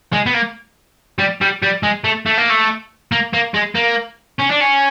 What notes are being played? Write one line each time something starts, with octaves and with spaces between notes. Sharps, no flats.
G#3
B3
A#3
G3
G3
G3
G#3
A3
A3
A#3
A3
A#3
A#3
G#3
A#3
C#4
D4
C#4